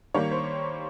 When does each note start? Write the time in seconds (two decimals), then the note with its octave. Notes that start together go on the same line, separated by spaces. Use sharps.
0.14 D#3 G3 A#3 C#5
0.31 C5